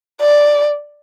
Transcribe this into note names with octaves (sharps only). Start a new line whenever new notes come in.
D5